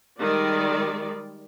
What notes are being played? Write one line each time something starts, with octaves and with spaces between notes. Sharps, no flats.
D#3 G3 G#3 D5